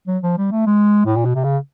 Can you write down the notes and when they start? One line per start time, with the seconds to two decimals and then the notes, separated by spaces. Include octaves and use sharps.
0.07 F#3
0.23 F3
0.38 G3
0.52 A3
0.67 G#3
1.06 A2
1.16 A#2
1.25 B2
1.35 C3
1.44 C#3